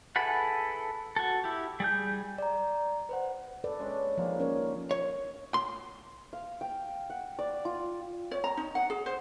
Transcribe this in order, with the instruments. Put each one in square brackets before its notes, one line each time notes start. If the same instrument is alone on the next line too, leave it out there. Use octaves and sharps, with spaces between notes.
[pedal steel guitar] E4 G#4 A4 B4 F#5
F#4 A4
E4 G4
G3 G#4 G6
[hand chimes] D5 A#5
B4 C5 F#5
[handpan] A4 B4 D5
[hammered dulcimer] G#3 C#4 D4
[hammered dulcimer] D#3 G#3 A#3 [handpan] F3
[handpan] C#4 A#4 C#5
[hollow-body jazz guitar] C#5
C6
[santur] F5
G5
F#5
D5
F4
[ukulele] C#5
A#5
D#4
F#5
G#4
C5